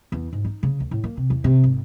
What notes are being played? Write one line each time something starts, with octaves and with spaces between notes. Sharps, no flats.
E2
G#2
D#4
C#3
D2
A2
A#3
C3
E2
C3
G#1